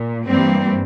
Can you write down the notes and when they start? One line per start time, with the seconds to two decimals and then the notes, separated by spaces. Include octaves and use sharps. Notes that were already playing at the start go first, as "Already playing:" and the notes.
Already playing: A#2
0.26 G2 E3 G3 A#3 C4